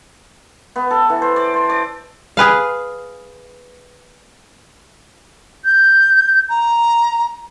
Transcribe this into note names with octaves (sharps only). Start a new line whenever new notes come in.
B3
A4
E3
C5
D5
C5
D5
G#4 B4 F5
G6
A#5